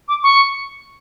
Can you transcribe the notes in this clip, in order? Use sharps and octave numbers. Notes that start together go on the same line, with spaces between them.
D6
C#6